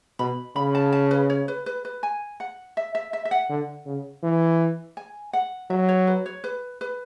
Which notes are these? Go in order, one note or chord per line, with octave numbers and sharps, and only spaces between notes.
B2 B5
C#3 B5
A5
A5
B4
C#5
B4
B4
B4
G#5
F#5
E5
E5
E5
E5
F#5
D3
C#3
E3
G#5
F#5
F#3 E5
C#5
B4
C#5
B4
B4